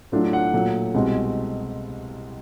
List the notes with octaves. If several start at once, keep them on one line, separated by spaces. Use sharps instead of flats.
A2 F#3 A3 D4 F4
F#5
A#2 F#3 A3
C2 B2 G#3 C4